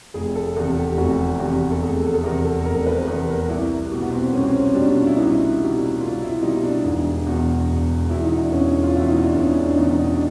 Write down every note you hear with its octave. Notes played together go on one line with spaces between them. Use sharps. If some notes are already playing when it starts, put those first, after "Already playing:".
F1 G#4
A4
E2 C3 A4
G4
F1 F#4
E2 C3 G4
A4
F1 G#4
A4
A4
E2 C3 A#4
A4
F1 A#4
B4
E2 C3 A#4
A#4
C2 E4
B2 G3
B3
C4
C2 C#4
C4
C#4
B2 G3 D4
F4
E4
C2 D#4
B2 G3
C2 F4
E4
B2 G3 D#4
D4
E1
E2 B2
E1
E2 B2 E4
D#4
D4
E1 C#4
F4
E2 B2 E4
D#4
D4
E1 C#4
D4
D4
E2 B2 D#4
D#4
D4